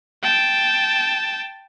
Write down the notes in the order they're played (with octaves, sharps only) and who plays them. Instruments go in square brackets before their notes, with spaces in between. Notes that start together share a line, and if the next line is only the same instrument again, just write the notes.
[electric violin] G5 A5